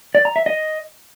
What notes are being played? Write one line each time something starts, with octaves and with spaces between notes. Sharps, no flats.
D5
A#5
E5
D#5